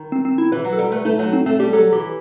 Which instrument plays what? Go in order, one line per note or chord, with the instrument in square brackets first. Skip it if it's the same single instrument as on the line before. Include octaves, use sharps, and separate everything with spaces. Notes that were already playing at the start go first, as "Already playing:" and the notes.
Already playing: [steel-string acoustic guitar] D#3
[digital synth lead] C4
C4
E4
[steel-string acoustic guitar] E3 [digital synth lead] B4
[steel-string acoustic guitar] F#3
[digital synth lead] A4
[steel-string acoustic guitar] G3
[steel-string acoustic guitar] A3 [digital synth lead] B4
[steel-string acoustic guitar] A3 [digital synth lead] D#4
[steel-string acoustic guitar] F#3 [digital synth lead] D#4
[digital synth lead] C4
[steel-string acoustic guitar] A3 [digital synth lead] C4
[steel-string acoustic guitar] G3 [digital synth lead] G4
[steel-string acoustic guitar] F#3 [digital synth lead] A4
[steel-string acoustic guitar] E3 [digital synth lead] G4